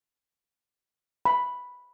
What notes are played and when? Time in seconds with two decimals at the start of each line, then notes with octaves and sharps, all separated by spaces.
1.25 B5